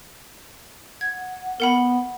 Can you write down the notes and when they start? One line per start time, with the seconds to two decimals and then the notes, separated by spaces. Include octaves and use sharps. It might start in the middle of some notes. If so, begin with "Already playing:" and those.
1.01 F#5 G#6
1.60 B3 A#4 F#5 B5